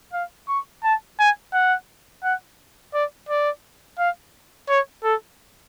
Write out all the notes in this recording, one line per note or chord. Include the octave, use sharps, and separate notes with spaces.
F5
C#6
A5
G#5
F#5
F#5
D5
D5
F5
C#5
A4